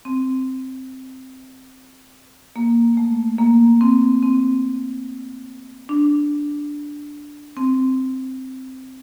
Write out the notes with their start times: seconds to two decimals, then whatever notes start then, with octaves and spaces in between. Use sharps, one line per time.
0.05 C4
2.56 A#3
2.97 A3
3.38 A#3
3.81 C4
4.23 C4
5.89 D4
7.57 C4